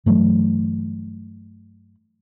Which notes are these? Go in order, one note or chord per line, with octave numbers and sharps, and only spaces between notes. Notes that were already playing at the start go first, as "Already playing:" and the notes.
G2 E3 F#3 A3